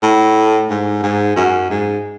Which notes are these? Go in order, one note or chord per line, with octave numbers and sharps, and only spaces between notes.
A2
G#2
G#2
F#2
G#2